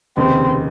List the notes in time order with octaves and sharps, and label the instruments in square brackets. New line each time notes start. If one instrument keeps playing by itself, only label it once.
[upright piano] F1 D#2 C#3 [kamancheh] C4